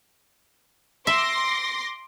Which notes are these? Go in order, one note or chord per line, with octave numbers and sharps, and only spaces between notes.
E5 C6 D6 A#6